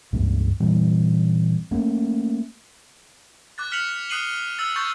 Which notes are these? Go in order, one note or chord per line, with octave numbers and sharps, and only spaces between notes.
C#2 G2
A#2 E3 G3 C4
A3 A#3 C#4
D6 F#6 A6
F6 B6 C#7 F7 F#7
D#6 F#6 C7 D#7 F#7 G7
E6 A6
C#6 G6 A6